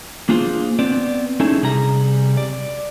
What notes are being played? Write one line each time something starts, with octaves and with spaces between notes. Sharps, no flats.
A#3 D4 F4 G#4 C5
B3 C4 D5
C#4 D#4 E4 G#4 A4
C3 G3 G#4 A#5
D5